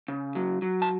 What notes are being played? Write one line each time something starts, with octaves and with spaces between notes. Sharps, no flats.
C#3
F#3
F#3
A5